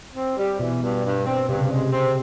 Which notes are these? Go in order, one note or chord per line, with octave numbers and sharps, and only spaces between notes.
C4
G3
B2 E3
G2
G2
C4
G2 C3
C#3
C3
G#3
C4